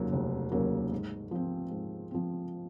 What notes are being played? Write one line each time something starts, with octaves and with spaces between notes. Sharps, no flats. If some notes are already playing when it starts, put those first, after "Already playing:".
Already playing: F1 D#2 C#3 F#3 A#3
F1
D#2 C#3 F#3 A#3
G#2
F3 C4
G#2
F3 C4